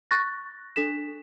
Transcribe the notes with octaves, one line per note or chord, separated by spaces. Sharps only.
C#6 F#6 A6 A#6
D4 A4 B6 E7